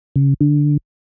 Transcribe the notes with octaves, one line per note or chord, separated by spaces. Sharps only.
C#3
D3